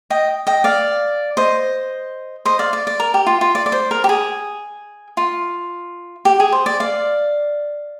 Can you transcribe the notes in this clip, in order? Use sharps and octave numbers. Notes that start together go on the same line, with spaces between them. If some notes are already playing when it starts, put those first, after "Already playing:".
D#5 G5
D#5 G5
D5 F5
C5 D#5
C5 D#5
D5 F5
D5
D5
A#4
G4
F4
F4
D5
D5
C5
A#4
G4
G#4
F4
G4
G#4
C5
D5
D5 F5